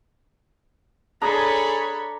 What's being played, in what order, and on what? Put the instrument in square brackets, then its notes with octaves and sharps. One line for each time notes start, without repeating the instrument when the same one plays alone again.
[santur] D4 A#5 [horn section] G#4 [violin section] A4 C#5 B5